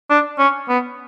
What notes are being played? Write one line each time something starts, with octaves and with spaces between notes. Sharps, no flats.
D4
C#4
B3